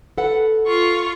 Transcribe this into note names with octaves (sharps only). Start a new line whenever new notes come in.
A4 B4 F#5
F4 C#6